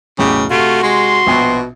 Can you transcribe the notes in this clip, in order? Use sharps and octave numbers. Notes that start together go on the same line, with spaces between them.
B1 E2 A2 C#3 G4
C3 A3 F4 F#4
G#3 C6
A#1 B2 B3 G5